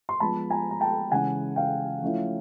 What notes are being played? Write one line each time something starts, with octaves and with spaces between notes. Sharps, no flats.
C6
F3 G#3 B3 A5 B5
G#5 A#5
A#5
G5 A5
C#3 E3 G#3 F#5 G#5
F5 G5
F3 A3 C#4 E4